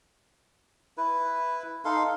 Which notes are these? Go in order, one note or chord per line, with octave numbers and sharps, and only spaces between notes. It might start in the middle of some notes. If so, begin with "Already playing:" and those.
E4 B4
D#4 A4 F5 C6